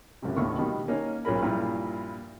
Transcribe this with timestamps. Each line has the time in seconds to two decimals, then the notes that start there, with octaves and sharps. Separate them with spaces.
0.22 C#2 F#2 C3
0.37 D#2 A2 D3 A#3 B3 C#6
0.58 B2 D#3 G3
0.88 A#3 C#4 D#4
1.25 B1 C#4 F4 G#4 A#4 B5
1.42 G2 A#2 F3 E4 F4